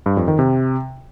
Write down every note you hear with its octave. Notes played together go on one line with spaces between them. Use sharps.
G2
F2
D#3
C3